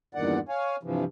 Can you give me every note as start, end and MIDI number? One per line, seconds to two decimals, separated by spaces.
0.15 0.39 40
0.15 0.39 43
0.15 0.39 46
0.15 0.39 51
0.15 0.39 74
0.15 0.39 78
0.49 0.76 73
0.49 0.76 77
0.49 0.76 80
0.83 1.04 43
0.83 1.04 48
0.83 1.04 52
0.83 1.04 53